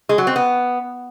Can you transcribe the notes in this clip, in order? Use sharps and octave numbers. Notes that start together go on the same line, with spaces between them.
G#3
F#3
C4
B3